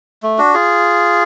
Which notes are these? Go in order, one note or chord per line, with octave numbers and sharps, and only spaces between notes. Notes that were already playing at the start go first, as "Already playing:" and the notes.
A3
D4 F#4
F4 G#4